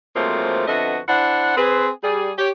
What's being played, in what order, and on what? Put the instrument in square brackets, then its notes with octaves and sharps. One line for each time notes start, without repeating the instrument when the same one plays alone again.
[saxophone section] G#2 F3 F#3 A3 A#3 C4
F2 D3 B3 F#4 D#5 E5
D4 E4 C5 F#5
C4 G#4 B4
G3 G#4
G4 C#5